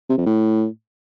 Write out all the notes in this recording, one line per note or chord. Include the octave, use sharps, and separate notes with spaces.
C3
F2
A2